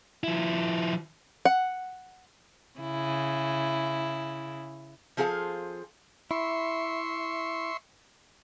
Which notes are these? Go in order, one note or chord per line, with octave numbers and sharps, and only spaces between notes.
F3 E4
F#5
C#3 E4
F3 C4 G#4 A4 F5
E4 E5 C6 C#6